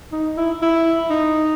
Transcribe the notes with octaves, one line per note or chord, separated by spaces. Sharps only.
D#4
E4
E4
D#4